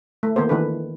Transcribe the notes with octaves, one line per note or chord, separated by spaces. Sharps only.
A3
D#3 A#3 B3 A4 C5
D#3 E3 D4 A4 B4